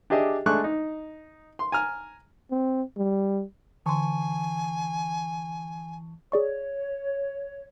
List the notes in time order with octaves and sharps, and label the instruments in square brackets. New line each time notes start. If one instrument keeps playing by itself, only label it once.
[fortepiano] D4 G4 G#4 D#5 E5
G#3 A3 D4 C#6 F#6
D#4
C6
G#5 A#5 F6
[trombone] C4
G3
[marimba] D3 C6 [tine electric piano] E3 A5 C#6 [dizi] G#5
[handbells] G#4 D5 C#6 [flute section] C#5